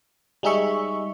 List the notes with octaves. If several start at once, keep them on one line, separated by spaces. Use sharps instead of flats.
G3 G#3 D#4 G#4 E5 C#6